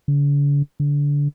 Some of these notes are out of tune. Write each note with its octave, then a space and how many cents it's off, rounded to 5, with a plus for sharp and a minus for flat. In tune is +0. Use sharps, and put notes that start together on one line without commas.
D3 -45
D3 -25